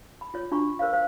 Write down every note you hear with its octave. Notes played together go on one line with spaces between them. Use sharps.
B5
F4 C#5
D4 F4 F#4 A#5 B5 C#6
A#4 C5 C#5 F5
C5 F5